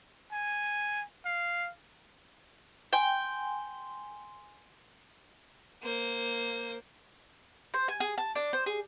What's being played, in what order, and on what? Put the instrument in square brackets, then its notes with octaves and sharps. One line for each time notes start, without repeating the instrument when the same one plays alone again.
[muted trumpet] G#5
F5
[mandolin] G5 [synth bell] G#5 C6 G7
[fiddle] A#3 C5
[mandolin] C5
G#5
G#4
A5
D4
C5
G#4